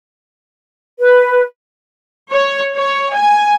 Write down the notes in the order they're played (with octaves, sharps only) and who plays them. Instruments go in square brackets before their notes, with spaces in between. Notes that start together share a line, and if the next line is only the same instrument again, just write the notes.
[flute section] B4
[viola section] C#5
C#5
G#5